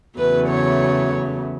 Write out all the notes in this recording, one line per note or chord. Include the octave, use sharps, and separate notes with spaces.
E2 C#3 F#3 A3 B4
C#5